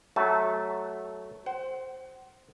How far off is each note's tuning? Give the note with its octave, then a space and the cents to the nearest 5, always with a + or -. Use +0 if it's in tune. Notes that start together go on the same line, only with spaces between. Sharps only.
F#3 +5 A3 -10 A5 -35
C5 +0 F#5 +35